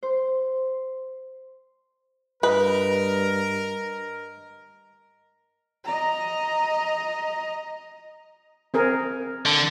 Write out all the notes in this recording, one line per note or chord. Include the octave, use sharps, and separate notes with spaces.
C5
G2 A#4 B4 D#5
D#5 A#5
C4 G#4 A#4
D3